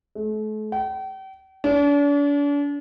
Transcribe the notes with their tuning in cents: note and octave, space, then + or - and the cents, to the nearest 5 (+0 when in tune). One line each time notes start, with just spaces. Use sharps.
A3 -40
G5 -40
D4 -40